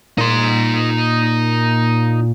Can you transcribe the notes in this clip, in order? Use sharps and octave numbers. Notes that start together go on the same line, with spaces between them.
A#2 D#4 C6